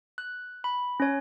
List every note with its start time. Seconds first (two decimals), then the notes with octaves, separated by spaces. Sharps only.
0.18 F#6
0.64 B5
1.00 C#4 C#5